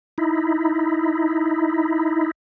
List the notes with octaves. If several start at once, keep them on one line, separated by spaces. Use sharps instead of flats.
D#4 E4